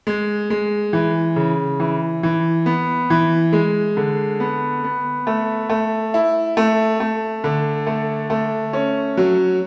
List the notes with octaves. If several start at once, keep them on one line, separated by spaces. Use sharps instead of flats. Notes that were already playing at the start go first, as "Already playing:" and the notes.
G#3
G#3
E3
C#3
E3
E3
B3
E3
G#3
D3
B3
B3
A3
A3
E4
A3
A3
D3
A3
A3
C#4
F#3